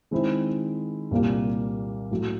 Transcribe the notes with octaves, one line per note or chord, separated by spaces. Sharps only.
D#3 G#3 C4 E4
C2 A#2 G3 A#3
A2 F#3 A3